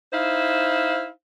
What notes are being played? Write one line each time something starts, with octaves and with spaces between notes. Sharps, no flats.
D#4 E4 C5 F5